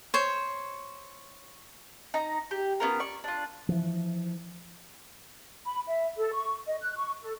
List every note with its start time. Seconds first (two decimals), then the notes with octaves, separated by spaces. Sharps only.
0.14 C5 C#5
2.14 D#4 A#5
2.51 G4
2.80 B3 C#4 F4 A#4
3.00 D5 C#6
3.24 D4 F4
3.69 E3 F3
5.67 B5
5.88 E5
6.19 A4
6.33 C#6
6.67 D#5
6.80 F#6
6.96 C#6
7.22 A4